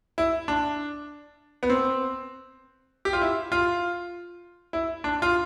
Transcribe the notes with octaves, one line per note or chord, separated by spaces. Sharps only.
E4
D4
B3
C4
G4
F4
E4
F4
E4
D4
F4